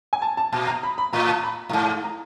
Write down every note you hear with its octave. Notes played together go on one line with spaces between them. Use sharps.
G#5
A5
A5
A#2 A5
A#5
B5
B5
A2 A#5
A5
B5
A2
G#2
A#5